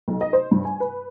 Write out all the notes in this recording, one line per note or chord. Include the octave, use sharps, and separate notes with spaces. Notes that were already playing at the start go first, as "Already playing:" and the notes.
B1
D#5
C5
G2
G#5
B4